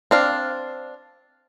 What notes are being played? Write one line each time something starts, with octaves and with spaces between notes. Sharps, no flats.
C4 D4 F5